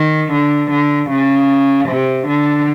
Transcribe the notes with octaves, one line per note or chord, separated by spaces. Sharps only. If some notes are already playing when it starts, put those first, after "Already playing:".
Already playing: D#3
D3
D3
C#3
C3
D3